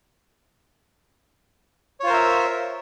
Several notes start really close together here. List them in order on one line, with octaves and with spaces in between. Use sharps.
C#5 F4 C5 A#4 E5